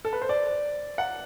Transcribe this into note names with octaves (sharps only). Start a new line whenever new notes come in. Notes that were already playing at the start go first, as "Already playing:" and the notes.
A4
B4
C5
D5
F#5